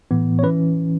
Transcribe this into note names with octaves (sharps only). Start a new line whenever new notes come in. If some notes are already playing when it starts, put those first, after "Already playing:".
A2 E3 B3
C#5
E3 C#4 B4